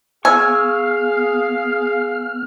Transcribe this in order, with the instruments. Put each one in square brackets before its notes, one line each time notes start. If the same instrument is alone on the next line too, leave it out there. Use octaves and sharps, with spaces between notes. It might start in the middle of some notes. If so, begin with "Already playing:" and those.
[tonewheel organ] B3 F6 [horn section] G#4 F5 [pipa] G#5 [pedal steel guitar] C#6 E6